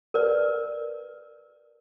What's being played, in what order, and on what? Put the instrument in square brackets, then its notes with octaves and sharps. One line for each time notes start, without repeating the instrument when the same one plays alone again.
[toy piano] A#4 B4 D5